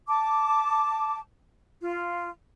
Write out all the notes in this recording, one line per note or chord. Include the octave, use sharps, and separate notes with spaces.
A5 D6
F4